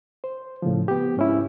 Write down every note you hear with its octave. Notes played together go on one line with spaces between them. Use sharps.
C5
A2 C#3 F3
B3 G4
G#2 C#4 E4